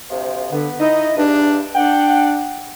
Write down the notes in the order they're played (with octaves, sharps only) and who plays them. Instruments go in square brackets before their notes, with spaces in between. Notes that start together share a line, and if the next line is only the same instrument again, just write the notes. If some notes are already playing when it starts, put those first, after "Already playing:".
[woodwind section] D2 C3 F3
[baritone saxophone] D3 [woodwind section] B3
[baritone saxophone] D#4 [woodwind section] E4 D#5
[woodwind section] E2 G2 [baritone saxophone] D4
[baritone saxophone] D4 [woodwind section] F#5 G5